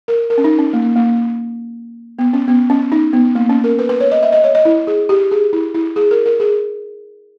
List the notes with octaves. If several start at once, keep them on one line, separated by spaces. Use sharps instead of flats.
A#4
A#4
C#4
D#4
C#4
A#3
A#3
B3
C#4
B3
C#4
D#4
B3
A#3
C#4
A#4
B4
B4
C#5
D#5
E5
D#5
C#5
D#5
E4
G#4
G4
G#4
E4
E4
G#4
A#4
A#4
G#4